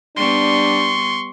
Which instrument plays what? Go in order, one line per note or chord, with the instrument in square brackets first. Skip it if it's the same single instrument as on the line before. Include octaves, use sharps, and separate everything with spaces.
[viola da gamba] G3 B3 [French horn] D4 [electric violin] C6 C#6